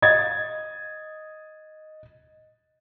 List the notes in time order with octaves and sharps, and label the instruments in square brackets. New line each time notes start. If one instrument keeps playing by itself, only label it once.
[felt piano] D#5 G#6 A6